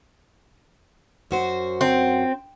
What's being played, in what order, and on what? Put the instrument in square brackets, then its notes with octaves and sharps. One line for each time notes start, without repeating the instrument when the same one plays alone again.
[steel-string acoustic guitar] F#2 F#4 C5
[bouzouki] C4